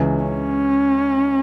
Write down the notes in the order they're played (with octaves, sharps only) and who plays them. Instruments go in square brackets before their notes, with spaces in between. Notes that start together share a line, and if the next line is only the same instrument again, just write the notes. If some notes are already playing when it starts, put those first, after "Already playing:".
Already playing: [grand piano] C#2 C#3 E3
[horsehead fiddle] C#4